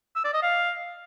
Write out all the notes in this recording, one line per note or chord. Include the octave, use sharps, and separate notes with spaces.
E6
D5
D#5
F5